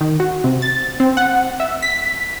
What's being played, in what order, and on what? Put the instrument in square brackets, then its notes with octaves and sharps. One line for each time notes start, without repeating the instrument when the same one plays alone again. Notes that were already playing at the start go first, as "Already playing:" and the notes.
[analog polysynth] D#3
F#4
C3
A6
C4
F#5
E5
B6